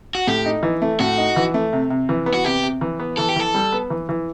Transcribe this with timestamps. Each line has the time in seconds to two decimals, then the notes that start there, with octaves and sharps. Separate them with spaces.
0.15 F#4
0.27 A2 G4
0.46 D#4
0.63 E3
0.82 A3
1.00 A2 F#4
1.18 D#4
1.36 E3
1.54 A3
1.73 C3
1.90 C3
2.09 E3
2.26 B3
2.34 F#4
2.44 C3 G4
2.63 C3
2.81 E3
3.00 B3
3.17 E3 A4
3.29 G4
3.36 E3 A4
3.54 G3
3.72 B3
3.90 E3
4.09 E3